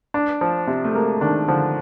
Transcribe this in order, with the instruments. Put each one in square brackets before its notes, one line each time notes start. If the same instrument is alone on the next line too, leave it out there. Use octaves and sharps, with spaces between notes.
[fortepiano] D4
F3
C3
[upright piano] A3
[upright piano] G#3 [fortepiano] A#3
[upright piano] D#3 [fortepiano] D4
[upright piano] D3 [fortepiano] F3